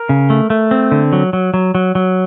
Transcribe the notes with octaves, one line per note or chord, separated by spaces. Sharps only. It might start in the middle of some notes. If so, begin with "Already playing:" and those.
Already playing: A#4
C#3
A3
A3
C4
D3
F#3
F#3
F#3
F#3
F#3